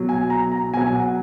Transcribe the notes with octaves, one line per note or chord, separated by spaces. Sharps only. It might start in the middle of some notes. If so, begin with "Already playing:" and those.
Already playing: B2 F#3
G#5
A#5
A#5
B2 F#3 G#5
F#5